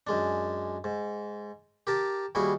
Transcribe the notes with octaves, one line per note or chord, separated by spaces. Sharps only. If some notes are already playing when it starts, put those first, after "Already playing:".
F#2 G#3 D4
G#2
G4 A#4 A5
D#2 G3 E4 F#4 G#4